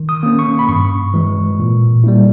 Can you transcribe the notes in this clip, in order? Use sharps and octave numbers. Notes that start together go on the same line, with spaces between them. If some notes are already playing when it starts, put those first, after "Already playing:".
Already playing: D#3
D#6
A#3 C#4
C#6
B5
G2 C#6
E3 G#3
A#2
G3 A#3 E4